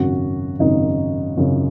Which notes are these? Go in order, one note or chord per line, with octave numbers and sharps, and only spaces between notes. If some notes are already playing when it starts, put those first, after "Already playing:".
Already playing: G#1 F#2 C#3 F#4
G#1 F#2 C#3 D#4
G#1 F#2 C#3